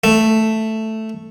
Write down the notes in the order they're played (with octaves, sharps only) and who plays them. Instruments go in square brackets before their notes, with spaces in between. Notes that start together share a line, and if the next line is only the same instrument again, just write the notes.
[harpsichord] A3